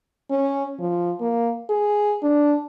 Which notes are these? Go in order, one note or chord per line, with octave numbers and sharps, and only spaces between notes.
C#4
F3
A#3
G#4
D4